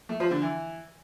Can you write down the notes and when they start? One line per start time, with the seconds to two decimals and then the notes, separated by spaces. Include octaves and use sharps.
0.09 A3
0.20 F3
0.31 D3
0.42 E3